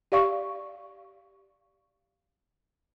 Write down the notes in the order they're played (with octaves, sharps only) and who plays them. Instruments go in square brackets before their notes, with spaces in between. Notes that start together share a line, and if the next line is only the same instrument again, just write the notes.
[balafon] G4 D5 F5 C#6